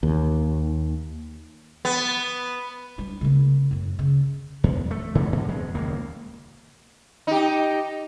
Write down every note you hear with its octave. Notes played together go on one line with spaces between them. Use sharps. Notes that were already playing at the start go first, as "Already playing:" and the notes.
D#2
B3
G3 D4
C#3 A#3
F#2 A2
C#3
E2
A3
G#2 D3 E3 A3
G#2 D3
E2 G#3
D#1 C#2 A#3
D#4 G4